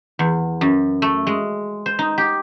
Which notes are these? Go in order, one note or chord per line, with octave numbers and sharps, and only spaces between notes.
E2
F#2
A3
G#3
C5
D#4
G4